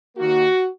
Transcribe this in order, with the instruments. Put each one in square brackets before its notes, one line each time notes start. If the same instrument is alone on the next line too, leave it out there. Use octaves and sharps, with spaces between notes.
[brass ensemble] D#2 D#3 A#3 F#4